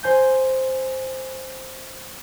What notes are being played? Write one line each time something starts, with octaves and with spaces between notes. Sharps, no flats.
C5 G#5 G6